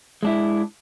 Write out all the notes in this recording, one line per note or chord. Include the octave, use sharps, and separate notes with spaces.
G#3 D4 E4